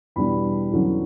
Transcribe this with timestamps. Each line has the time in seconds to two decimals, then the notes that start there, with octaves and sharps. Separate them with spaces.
0.16 E2 B2 G3 D4 B5
0.72 E2 D3 F#3 C#4